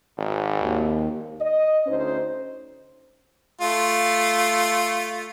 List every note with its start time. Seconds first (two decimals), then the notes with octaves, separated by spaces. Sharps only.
0.18 G#1
0.62 D#2
1.41 D#5
1.87 D2 C#4 D#4 C5
3.61 A3 F4